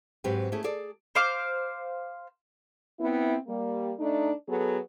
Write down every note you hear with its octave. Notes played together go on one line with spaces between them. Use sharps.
G#2 F#3 C4 G4 B4
A3 C#4 E4 G#4
G#4 A4 D5
C5 F5 D6
B3 C4 E4
G3 A#3
A3 D4 D#4
F#3 B3 G#4 A4